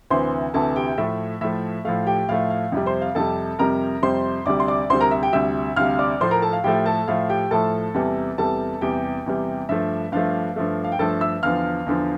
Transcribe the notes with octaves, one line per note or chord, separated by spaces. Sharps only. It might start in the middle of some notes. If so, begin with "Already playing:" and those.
D2 C3 E3 C5 C6
D2 C3 E3 A4 A5
G4 G5
A2 F3 A3 E5
A2 F3 A3 E5
A2 F3 A3 F5
G4 G5
A2 F3 A3 F5
F5
F2 C3 G3
C5 C6
F5
F2 C3 G3 A4 A5
F2 C3 G3 A#4 A#5
F2 C3 G3 C5 C6
D2 C3 G3 D5 D6
C6
D5 D6
D2 C3 G3 C5 C6
A#4 A#5
E5
G4 G5
D2 C3 G3 E5 E6
D2 C3 G3 F5 F6
D5 D6
A2 F3 A3 C5 C6
A#4 A#5
A4 A5
F5
A2 F3 A3 G4 G5
A4 A5
A2 F3 A3 F5
G4 G5
A2 F3 A3 A4 A5
E2 C3 G3
E2 C3 G3 A4 A5
E2 C3 G3 G4 G5
E2 C3 G3
G2 F3 A3 E5
G2 F3 A3 F5
G2 F3 A3
F5
G5
G2 F3 A3 A4 A5
E5 E6
E2 D3 F3 F5 F6
E2 D3 F3